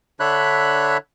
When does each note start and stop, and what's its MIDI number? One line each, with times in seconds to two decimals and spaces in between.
0.20 0.97 50
0.20 0.97 62
0.20 0.97 73
0.20 0.97 76
0.20 0.97 83
0.20 0.97 90